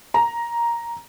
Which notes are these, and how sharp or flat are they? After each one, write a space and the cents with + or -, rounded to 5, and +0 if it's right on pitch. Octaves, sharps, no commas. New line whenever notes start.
A#5 +5